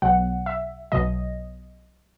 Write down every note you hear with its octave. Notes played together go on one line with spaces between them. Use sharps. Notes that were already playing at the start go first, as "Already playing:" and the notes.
B1 B2 F#3 F#5
E5
B1 B2 F#3 D#5